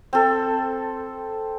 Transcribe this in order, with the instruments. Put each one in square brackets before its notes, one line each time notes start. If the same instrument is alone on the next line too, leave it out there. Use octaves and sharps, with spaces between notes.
[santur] C4 A4